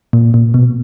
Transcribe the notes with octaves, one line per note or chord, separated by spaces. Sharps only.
A#2
A#2
B2